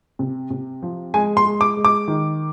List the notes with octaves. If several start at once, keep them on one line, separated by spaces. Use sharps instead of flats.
C3
C3
F3
G#3 G#5
C6
G#3
D6
G#3
D6
D#3